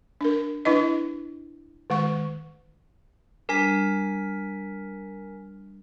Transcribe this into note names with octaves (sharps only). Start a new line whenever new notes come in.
D4 A#4
D4 E4 B4 D#5
D#3 G#3 C#6
G3 D4 A#4 G#5 B6